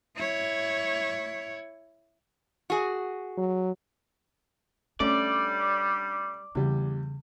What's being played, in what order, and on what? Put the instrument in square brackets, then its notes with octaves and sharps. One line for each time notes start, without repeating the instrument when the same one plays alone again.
[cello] E4 C#5
[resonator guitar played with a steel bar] F#4 G#4
[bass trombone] F#3
[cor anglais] G3 [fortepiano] A3 C#4 [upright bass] D4 [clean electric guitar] D5
[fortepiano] E2 G3 [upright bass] C#3